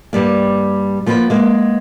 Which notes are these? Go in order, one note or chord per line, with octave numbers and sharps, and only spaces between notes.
G2 G3 A#3
F3 A#3 B3 A4 B4
G#3 A#3 B3